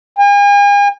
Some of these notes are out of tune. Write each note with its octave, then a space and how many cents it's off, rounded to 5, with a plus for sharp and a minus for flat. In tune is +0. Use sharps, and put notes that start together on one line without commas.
G#5 -40